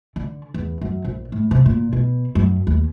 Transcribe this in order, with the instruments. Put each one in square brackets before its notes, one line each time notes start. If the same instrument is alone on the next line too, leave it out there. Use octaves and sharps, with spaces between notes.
[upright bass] D3
E2
F#2
A#1
A2
C3
A#2
B2
F#2
D#2